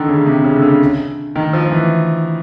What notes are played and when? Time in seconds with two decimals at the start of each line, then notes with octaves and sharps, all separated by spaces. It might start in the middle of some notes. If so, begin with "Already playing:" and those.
Already playing: D3 D#3
0.09 C#3
0.26 C3
0.44 C#3
0.56 D3
0.62 C#3
1.36 D#3
1.53 F3
1.71 E3